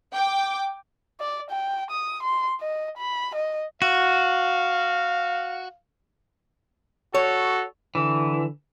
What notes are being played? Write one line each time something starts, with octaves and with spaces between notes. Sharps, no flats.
G5 D6
D5
G5
D#6
C6
D#5
B5
D#5
F#4 F5
F#4 A4 C#5
D3 E3